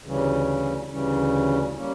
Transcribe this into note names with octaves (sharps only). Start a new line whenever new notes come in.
D2 C#3 E3 G3 C#4
D2 C#3 E3 G3 C#4
G3 A#3 C#4